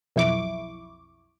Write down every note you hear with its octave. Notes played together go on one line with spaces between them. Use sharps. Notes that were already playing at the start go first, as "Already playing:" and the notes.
B1 F2 E4 C#6 D6